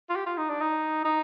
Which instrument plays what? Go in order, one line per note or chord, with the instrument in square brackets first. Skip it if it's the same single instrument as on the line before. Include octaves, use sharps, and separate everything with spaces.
[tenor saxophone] F4
G4
F4
D#4
D4
D#4
D#4